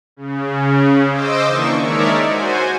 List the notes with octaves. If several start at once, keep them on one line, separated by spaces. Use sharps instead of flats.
C#3
C5 D#5 D6 E6
D#3 E3 A#3 D4 C#6
G#3 D#4 A#4 C#5 D5 E5
F#4 C5 G#5